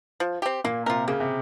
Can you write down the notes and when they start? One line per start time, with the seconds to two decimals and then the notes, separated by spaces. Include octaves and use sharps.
0.20 F3
0.42 C4 G4
0.64 A#2 A#3
0.86 C3 F4 A#4
1.08 C#3 A#3
1.20 C3